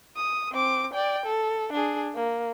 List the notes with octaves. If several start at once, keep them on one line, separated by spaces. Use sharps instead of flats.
D#6
C4 D6
D5 G5
A4
D4 G#4
A#3